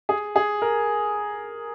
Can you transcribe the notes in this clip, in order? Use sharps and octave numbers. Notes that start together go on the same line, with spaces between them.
G#4
G#4
A#4